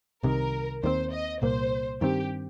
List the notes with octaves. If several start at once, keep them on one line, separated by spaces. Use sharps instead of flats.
C2 C3 D#3 A#4
D#2 D#3 G3 C4 C5
D#5
C2 A#2 A#3 C5
G2 D#3 C4 G4